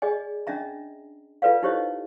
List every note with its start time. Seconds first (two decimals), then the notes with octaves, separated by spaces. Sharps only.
0.02 G#4 D5 D#5 G#5
0.47 C#4 D4 D#5 E5 A#5
1.42 F4 A4 B4 D5 F5
1.63 D#4 E4 G4 C5 C#5 D#5